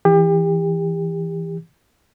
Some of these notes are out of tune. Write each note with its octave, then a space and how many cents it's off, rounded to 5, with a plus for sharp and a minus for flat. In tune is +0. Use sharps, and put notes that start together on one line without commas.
E3 +0 G4 +35